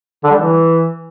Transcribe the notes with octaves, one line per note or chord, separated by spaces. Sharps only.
D3
G3
E3